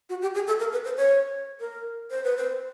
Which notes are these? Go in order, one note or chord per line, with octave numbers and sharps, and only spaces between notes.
F#4
G4
G#4
A4
A#4
B4
C5
C#5
A#4
C5
B4
C5